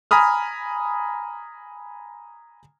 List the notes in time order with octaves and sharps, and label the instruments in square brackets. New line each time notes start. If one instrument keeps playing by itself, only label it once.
[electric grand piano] G#5 A#5 B5 D#6 F6